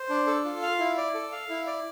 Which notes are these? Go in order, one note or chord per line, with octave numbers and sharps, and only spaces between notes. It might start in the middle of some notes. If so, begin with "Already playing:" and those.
Already playing: C5
D4
A4
F4
F5
E4
D5
A4
F5
E4
D5